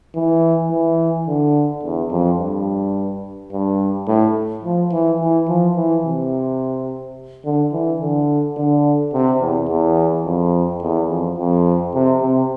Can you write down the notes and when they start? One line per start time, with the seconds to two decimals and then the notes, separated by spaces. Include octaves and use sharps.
0.15 E3
0.71 E3
1.28 D3
1.83 E2
2.11 F2
2.39 G2
3.52 G2
4.07 A2
4.64 F3
4.92 E3
5.20 E3
5.48 F3
5.76 E3
6.05 C3
7.45 D3
7.72 E3
8.01 D3
8.57 D3
9.13 C3
9.42 E2
9.69 E2
10.25 F2
10.82 E2
11.09 F2
11.38 F2
11.94 C3
12.21 C3